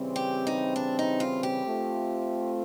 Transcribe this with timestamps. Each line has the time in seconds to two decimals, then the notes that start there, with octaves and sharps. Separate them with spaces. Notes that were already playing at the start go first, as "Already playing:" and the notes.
Already playing: C#3 E3 G3 C4
0.16 G4
0.47 D#4
0.76 D4
0.99 D#4
1.20 F4
1.43 G4
1.65 A3 C4 F4